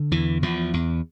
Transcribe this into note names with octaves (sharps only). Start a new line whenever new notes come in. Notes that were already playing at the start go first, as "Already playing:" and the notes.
Already playing: D3
E2 E3
E2 F3
E2